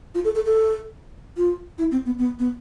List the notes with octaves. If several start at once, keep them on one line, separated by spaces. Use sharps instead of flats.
F4
A4
A4
A4
F4
E4
C4
B3
B3
B3